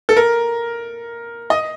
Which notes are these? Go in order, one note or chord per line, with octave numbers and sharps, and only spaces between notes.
A4
A#4
D#5